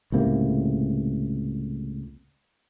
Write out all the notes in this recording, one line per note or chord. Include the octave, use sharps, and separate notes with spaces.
C#2 A2 C3 A#3